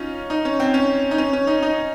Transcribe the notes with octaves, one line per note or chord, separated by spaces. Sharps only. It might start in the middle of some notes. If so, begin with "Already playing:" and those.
Already playing: C#4 D#4 F4
D#4
C#4
C4
C#4
D#4
C#4
C#4
D#4
D#4